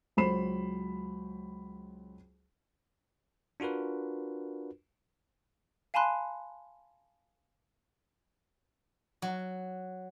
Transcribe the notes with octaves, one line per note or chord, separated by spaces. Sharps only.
C#2 F#3 C5 B5 C7 E7
D4 F4 F#4 A#4 B4
F5 G#5 A5 B5 C6 F#6
F#3